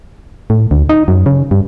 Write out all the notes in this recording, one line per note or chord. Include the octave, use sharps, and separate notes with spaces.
A2
D2
D#4
F#2
C#3
G2